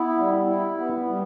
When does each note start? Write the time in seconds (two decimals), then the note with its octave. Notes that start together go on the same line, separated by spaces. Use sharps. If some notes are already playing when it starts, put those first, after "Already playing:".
Already playing: B3 E4
0.18 G3
0.49 E4
0.79 B3
1.09 G3